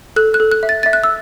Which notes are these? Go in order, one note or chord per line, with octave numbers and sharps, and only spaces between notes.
A4 F#6
F#6
A4
F#6
E5
A6
E5 A6
F#6
E6